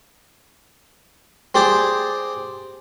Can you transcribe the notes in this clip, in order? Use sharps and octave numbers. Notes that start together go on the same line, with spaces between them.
C4 G4 G#4 D5 D6